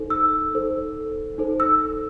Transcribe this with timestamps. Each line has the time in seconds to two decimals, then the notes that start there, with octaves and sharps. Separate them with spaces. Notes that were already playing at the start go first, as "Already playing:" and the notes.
Already playing: D#4 A4 C5
0.10 E6
0.54 D#4 A4 C5
1.38 D#4 A4 C5
1.60 E6